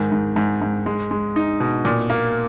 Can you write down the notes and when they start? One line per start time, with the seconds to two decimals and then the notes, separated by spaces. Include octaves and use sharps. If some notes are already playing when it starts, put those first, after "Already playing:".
Already playing: G#2 D#3
0.12 G#2
0.36 G#2
0.62 G#2
0.86 G#3
1.11 G#3
1.36 D#4
1.60 B2
1.85 A#2
2.10 A#3